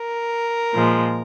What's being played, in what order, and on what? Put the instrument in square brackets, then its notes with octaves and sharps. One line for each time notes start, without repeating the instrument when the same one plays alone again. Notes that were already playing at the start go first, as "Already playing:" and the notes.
Already playing: [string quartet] A#4
A#2 F3 G#3